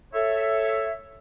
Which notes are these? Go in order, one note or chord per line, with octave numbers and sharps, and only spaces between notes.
A4 C#5 E5